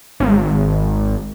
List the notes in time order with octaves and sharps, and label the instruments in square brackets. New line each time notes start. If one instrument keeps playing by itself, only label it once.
[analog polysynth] G#1